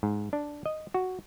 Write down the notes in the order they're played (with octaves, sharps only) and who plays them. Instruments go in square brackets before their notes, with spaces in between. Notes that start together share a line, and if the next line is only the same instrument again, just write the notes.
[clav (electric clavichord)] G#2
D4
D#5
F#4